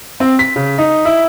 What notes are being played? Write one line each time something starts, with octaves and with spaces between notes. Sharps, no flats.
C4
B6
C#3
D#4
E4